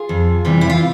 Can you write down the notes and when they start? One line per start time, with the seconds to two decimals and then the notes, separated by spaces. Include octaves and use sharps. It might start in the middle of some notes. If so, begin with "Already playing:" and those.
Already playing: F4 G#4
0.09 F2
0.45 C3 E3 G3
0.61 E4
0.70 F4